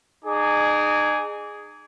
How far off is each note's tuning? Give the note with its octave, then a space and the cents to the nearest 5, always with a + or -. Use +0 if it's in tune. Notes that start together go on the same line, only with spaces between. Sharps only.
D#4 -40 G#4 +0 D6 -30